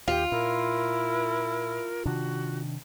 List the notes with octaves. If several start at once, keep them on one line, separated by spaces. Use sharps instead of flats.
D#2 F4 G4
A#2 E4 A#4
C3 D#3 D4 F#4